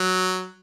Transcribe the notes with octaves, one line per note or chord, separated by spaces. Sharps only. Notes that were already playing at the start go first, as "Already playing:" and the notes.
Already playing: F#3